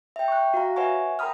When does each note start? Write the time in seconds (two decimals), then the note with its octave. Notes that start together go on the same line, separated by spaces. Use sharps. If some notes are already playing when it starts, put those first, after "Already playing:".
0.16 E5 G5
0.28 C#6 F#6
0.54 F#4 F5 A#5
0.76 B4 C#5 E5 F#5 G#5 C#6
1.19 A#4 G5 A#5 B5 D#6 F6